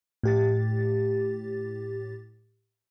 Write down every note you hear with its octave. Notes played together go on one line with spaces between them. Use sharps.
A2 G4 A6